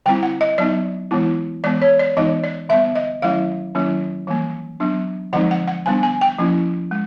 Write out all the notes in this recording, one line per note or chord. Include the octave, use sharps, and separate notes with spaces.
D3 G3 C4 E4 G5
F#5
D#5
F#3 B3 D#4 D5
E3 G#3 B3 E4
E3 G#3 B3 D5
C#5
D5
E3 G#3 B3 D#4 D#5
D5
D3 G3 B3 E5
D#5
D#3 F#3 A3 C#4 E4 F5
D#3 F#3 A#3 C#4 E4
E3 G3 A#3
F#3 B3 D4
D3 F3 G#3 C4 D#4 F#5
F#5
F#5
D3 G3 B3 D4 G#5
G#5
G5
F3 A#3 C#4 E4
G#3